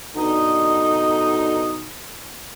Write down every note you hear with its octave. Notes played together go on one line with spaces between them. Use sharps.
B2 D3 D#4